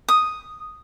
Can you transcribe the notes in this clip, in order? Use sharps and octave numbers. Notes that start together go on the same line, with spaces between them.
D#6